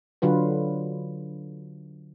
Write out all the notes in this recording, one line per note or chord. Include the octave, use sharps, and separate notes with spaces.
D3 F#3 F4 B4